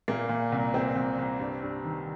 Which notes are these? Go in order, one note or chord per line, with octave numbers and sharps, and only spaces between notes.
A#2 A#3
A#2
C2
A#2 C4
C2
C2
G2
G2
D#3